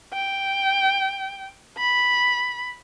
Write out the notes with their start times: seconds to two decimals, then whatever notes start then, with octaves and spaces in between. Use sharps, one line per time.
0.14 G5
1.78 B5